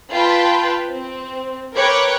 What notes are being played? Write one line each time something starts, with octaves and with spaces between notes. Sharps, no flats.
F4 B4 G5 A5 B5
C4
A#4 B4 C#5 G5 D6 F#6